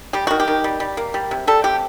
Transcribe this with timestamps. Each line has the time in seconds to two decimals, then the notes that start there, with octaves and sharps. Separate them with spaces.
0.13 G3 G4
0.27 D#3 F#4
0.40 G4
0.48 D#3
0.64 G3
0.80 G3
0.97 A#3
1.14 G3
1.31 C3
1.47 G3 A4
1.64 C3 G4